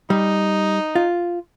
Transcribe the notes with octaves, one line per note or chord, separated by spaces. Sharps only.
G3 D#4
F4